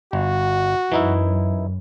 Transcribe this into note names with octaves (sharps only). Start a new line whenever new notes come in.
G1 F#4
F#2 E3 D#4 E4